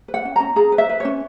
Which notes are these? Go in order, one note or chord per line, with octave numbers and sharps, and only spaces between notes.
B4
F#5
C#4
C#4 A#5
G#4 A#5
B4
E5
B4
C#4 C#5